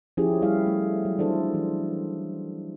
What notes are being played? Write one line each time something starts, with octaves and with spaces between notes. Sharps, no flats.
F3 C#4 E4 G4 G#4
G3 A3 E4 G#4 E5 F5
A3
F#3
E3 D4 E4 A4 C5
E3